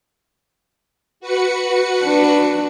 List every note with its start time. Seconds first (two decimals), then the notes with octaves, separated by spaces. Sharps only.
1.20 F#4 B4 C#7
2.05 D4